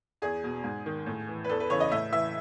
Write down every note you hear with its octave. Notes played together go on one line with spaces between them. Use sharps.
E2 G#4
B2
G#2
D#3
A2
E3
B4
E2 A4
B4
C#3 E3 C#5
D#5
A2 E5
E3 E5